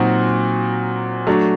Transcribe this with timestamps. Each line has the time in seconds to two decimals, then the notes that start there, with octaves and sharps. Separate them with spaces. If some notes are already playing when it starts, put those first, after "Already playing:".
Already playing: A#2 F#3 C4 D#4 F#4
1.27 F#3 A3 D4